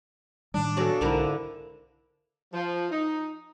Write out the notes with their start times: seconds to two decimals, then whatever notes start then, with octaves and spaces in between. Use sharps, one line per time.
0.54 A2 D#3 G3 D4
0.77 C#3 F#3 B3 A4 D5
1.01 B1 F2 G#2 D3 E4 A#4
2.54 F3
2.91 D#4